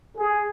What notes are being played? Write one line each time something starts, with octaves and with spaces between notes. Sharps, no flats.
G#4